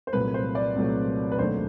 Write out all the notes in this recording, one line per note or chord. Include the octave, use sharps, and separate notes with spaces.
C5
C2 A#2 F#3 A3 B4
C5
D5
C2 A#2 F#3 A3
B4
E1 D#2 D3 F#3 A3 C5